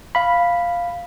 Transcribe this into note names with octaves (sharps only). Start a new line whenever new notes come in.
F5 B5